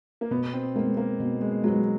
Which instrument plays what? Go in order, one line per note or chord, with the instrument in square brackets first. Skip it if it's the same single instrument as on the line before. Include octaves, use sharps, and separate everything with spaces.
[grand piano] A#3
[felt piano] B2 [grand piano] B3
[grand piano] C4
[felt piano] G#3 [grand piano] A#3
[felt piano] B3
[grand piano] A#3
[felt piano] B2
[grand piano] G#3
[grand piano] F#3 [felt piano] G#3
[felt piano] B3